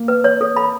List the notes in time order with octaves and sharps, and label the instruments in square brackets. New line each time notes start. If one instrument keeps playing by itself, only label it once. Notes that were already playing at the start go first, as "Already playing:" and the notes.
Already playing: [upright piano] A#3
[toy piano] B4
C#5
A4
B5